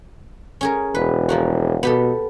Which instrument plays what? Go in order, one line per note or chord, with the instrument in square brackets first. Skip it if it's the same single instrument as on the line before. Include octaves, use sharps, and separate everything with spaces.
[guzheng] C#4 G#4 A#4
[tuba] E1 [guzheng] B4
[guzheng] F3 A#3 F#4
[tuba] B2 [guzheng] B3 G4 A4